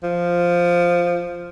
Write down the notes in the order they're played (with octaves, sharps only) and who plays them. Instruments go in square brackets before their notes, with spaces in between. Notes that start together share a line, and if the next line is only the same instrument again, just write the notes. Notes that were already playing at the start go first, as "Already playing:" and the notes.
[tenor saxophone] F3